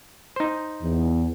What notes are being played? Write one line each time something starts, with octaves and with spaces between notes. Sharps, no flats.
D#4 C5
E2